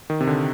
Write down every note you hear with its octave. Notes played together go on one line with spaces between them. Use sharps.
D#3
C3
D3